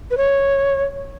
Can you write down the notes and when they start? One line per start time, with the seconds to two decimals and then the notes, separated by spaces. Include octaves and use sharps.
0.11 B4
0.17 C#5